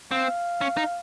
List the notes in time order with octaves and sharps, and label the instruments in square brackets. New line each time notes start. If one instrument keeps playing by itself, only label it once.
[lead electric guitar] C4 [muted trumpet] F5
[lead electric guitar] C#4
D#4